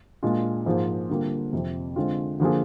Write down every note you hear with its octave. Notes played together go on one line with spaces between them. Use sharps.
A#2 G#3 D4 F4
G#2 F3 A#3 F4 G#4
D3 G3 A#3 F4
F2 C3 F3
D3 G#3 C4 F4
D3 F3 A#3 F4 G#4